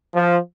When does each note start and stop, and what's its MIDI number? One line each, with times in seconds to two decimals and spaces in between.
0.14 0.38 53